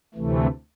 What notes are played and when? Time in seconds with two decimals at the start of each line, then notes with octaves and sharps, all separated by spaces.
0.14 D2 C3 E3 A3